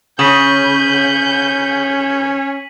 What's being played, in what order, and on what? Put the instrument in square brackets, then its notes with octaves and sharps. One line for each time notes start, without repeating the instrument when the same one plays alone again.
[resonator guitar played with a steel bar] C#3 [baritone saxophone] C#4 [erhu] G6 [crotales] B6 D#7 F#7